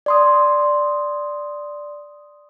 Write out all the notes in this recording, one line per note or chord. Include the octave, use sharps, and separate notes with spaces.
D5 C6 D#6